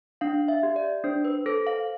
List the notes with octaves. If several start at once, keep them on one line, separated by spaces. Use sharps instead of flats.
D4 F5
E5
G4
D5
D4 C5
B4
A4 C5
F5